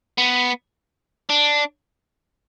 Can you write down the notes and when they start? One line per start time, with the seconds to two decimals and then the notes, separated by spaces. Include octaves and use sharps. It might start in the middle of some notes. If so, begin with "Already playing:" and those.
0.18 B3
1.29 D4